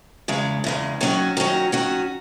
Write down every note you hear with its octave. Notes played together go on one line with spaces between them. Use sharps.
E2 C#3 G#3
E2 C#3 G#3
D#3 F#3 C#4 F#4
D#3 F#3 C#4 F#4
D#3 F#3 C#4 F#4